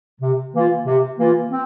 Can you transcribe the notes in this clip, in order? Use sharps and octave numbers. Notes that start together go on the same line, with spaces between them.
C3
E3 A#3 F4
C3
E3 A#3 F4
C4